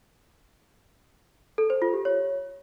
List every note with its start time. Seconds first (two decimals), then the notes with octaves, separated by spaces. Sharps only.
1.58 A4
1.70 C5
1.82 F4
1.93 G4
2.05 C#5